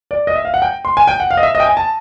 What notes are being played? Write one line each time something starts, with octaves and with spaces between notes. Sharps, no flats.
D5
D#5
E5
F5
F#5
G5
C6
G#5
G5
F#5
F5
D#5
E5
D#5
G5
G#5
A5